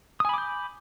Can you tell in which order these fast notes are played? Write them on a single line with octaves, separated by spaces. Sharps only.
D#6 G#5 B5 D6 G6